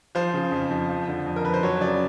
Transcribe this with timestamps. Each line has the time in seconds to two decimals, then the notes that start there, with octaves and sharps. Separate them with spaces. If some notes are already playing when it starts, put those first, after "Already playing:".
0.15 F3 C5
0.34 C#3
0.52 F2
0.70 F2
0.89 F3
1.08 D3
1.26 F2
1.36 A#4
1.44 F2 B4
1.54 C5
1.63 F#3 C#5
1.81 C#3 D5